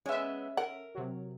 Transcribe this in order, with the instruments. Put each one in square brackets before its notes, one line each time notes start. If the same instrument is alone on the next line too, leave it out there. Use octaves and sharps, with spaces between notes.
[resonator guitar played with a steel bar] G#3 B3 [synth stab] C#4 E5
[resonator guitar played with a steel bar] A#4 [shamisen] F#5
[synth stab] C3 F#3